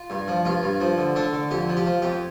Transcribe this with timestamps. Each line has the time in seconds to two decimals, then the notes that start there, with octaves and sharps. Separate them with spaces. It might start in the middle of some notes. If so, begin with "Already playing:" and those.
Already playing: F4
0.10 G2
0.28 F3
0.45 G2 F4
0.63 G2
0.80 F3
0.98 D3
1.15 D3 D4
1.33 D3
1.51 F2 G4
1.69 F3
1.77 G4
1.86 F3
2.02 F2 G4